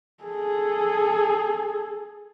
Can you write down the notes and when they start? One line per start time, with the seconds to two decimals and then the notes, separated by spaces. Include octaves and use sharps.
0.24 G#4 A4